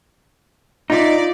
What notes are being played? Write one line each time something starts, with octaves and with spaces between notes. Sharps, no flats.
D#4 F4 D5 E5